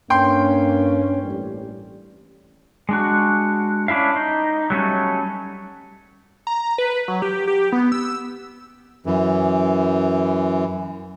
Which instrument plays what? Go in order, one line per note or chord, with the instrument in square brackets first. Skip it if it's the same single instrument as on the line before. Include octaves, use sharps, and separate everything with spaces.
[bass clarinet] G2 [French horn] A#3 [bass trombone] C#4 [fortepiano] G5 C6
[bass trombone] A1 [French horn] G3
[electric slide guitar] G#3 D4 F#4
C#4 D4 E4 E5 F5
D#4
F#3 G3 A3 C#4
[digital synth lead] A#5
B4
F#3
G4
G4
B3
E6
[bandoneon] F#2 E3